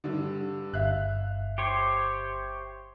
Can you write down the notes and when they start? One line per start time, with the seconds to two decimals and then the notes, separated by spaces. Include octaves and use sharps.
0.04 G2 D3
0.74 G1 E5 F5 F#6
1.58 G4 C5 C#5